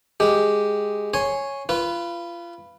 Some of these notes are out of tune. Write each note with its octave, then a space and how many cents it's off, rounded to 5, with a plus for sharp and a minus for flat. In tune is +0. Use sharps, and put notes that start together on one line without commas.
G#3 +0 G4 +0
C#5 -5 G#5 +0 C6 +0
F4 -25 B4 +0